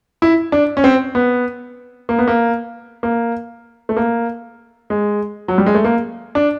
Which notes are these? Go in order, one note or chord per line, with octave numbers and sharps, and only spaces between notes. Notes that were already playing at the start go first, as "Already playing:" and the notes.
E4
D4
C#4
C4
B3
A#3
B3
A#3
A#3
A3
A#3
G#3
F#3
G3
G#3
A3
A#3
D4